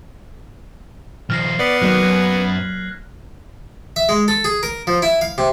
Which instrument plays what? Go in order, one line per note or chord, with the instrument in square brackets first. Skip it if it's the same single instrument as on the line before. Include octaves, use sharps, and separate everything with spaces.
[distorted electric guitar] D#3 F3 [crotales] F6 A#6 C7
[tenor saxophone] B3 [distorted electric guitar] D5 [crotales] B6 F#7
[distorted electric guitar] D#3 [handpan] F#3 A#3 D5 [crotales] F#6
[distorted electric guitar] F#2 [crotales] G#6
[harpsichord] E5
G#3
A4
G#4
A#4
F3
E4
F5
C3